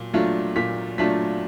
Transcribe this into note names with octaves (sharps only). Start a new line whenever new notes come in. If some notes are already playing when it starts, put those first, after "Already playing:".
Already playing: A#2 F#3
F#3 A3 D4 F4
A#2 B6
F#3 A3 D4 F4 B6